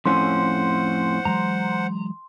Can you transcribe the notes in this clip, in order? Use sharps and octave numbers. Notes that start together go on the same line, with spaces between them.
F2 A2 C#4 C5 F#5 C6
E3 F#3 G#3 A#5